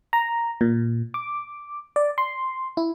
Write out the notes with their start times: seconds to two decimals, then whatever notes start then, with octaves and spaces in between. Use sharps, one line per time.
0.13 A#5
0.61 A#2
1.14 D6
1.96 D5
2.18 C6
2.77 E4